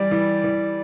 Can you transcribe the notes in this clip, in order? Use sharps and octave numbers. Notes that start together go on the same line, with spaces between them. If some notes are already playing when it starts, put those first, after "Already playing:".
Already playing: E3 G3 D5
E3
E3